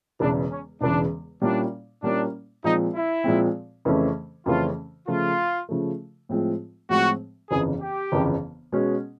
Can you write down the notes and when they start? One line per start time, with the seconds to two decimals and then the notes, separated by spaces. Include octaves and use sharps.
0.20 E1 E2 C#3 E3 D4
0.50 C#4
0.81 E1 E2 C#3 E3 D4
1.42 A#2 G3 A#3 C#4 D4 E4
2.03 A#2 G3 A#3 C#4 D4 E4
2.64 A#2 F3 G#3 C4 D#4
2.94 E4
3.24 A#2 F3 G#3 C4
3.85 F2 C#3 E3 A3 C#4
4.46 F2 C#3 E3 A3 C#4 F4
5.07 C#3 F3 A3 F4
5.69 C#3 F3 A3
6.29 A2 F3 G#3 C4 F4
6.89 A2 F3 G#3 C4 F4 F#4
7.51 G1 F2 C#3 E3 G#4
7.81 G4
8.12 G1 F2 C#3 E3
8.72 B2 G#3 C#4